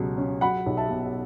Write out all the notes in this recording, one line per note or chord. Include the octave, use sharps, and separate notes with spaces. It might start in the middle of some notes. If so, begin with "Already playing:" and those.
Already playing: C#2 B2 F#3
C#4
F#3 F#5 B5
B1
E5 A5
B2